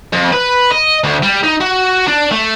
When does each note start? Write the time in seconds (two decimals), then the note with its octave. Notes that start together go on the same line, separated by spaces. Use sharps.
0.13 F2
0.32 B4
0.71 D#5
1.04 D2
1.23 G3
1.44 D#4
1.61 F#4
2.07 D4
2.31 A3